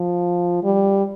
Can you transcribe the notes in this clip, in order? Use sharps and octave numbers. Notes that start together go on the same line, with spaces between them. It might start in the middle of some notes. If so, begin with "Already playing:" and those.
Already playing: F3
G3